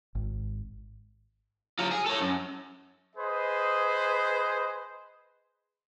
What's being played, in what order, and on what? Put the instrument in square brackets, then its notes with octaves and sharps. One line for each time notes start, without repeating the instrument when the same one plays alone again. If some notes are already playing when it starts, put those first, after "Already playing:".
[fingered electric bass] G#1
[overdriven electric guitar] F#3 F4
G#4
A4 C#5
F#2
[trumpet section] G#4 B4 C5 D#5